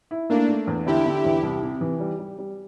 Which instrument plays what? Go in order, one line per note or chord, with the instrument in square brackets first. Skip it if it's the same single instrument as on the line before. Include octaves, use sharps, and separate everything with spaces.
[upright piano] E4
[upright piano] A3 [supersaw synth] A#3 D4
[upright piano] A3
E2
[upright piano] D3 [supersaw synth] E4 G4
[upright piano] D3
E2
C2
C3
E3
G3
G3
G3